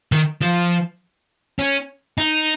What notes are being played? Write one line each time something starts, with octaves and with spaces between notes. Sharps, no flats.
D#3
F3
C#4
D#4